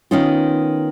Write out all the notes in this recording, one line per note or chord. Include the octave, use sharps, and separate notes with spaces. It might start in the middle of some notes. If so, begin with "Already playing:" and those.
D#3 B3 C#4 D#4 F4